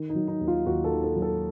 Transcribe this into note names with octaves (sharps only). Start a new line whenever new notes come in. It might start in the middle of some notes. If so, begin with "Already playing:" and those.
Already playing: D#3
D#4
F#3
D#4
D#2
F4
D#2 F#4
A4
D#3
A4
F#3
A4